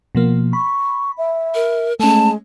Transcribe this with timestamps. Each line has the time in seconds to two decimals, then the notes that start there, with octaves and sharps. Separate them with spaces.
0.15 B2 F3 A#3
0.53 B5 C#6
1.18 E5
1.54 A#4
2.00 G#3 A3 C#4 A5